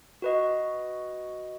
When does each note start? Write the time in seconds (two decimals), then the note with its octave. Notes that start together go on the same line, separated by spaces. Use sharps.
0.22 F#4 B4 D#5